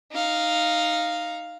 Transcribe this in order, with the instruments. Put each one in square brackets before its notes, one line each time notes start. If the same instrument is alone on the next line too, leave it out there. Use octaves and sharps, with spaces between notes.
[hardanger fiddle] D#4 F5